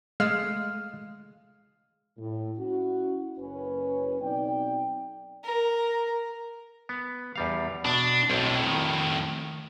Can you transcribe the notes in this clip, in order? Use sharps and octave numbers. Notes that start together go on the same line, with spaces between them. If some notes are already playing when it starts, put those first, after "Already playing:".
G#3 A3 F5
A2
C#4 E4 F#4
F#1 C#4 B4
B1 C4 D#4 D5 G5
A#4
B3
E2 G3 F5
B2 D4
B1 F2 A2
D#3